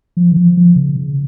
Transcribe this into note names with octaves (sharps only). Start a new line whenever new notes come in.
F3
D#3
F3
F3
C#3
C#3